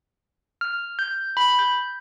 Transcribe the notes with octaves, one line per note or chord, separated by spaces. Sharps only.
F6
G6
B5
G6